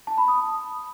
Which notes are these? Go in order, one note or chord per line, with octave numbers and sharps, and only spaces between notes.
A5
B5
D#6